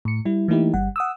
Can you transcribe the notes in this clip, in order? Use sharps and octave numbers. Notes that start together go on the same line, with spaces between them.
A2 C#7
G3 E4
E3 A3 A#3 D#4 E4 G4
G1 G3 F#5
F#5 D#6 E6